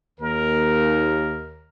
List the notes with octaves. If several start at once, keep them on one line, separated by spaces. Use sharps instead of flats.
D#2 A#4